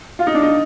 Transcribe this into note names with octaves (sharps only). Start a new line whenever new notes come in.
F4
D#4
D4
D#4